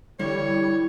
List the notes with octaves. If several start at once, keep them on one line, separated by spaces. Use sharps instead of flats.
D3 E3 G3 E4 C#5